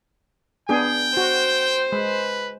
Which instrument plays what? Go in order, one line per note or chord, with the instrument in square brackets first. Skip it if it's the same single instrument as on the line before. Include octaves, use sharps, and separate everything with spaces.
[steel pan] B3 D4 G#4 [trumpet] G5
[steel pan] F#4 [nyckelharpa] C5
[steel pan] G#3 [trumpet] B4